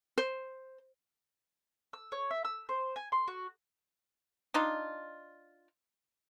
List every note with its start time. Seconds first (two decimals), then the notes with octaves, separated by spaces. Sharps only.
0.18 C5
1.93 E6
2.12 C#5
2.31 E5
2.45 E6
2.69 C5
2.96 G#5
3.12 C6
3.28 F#4
4.54 D4 D#4 F4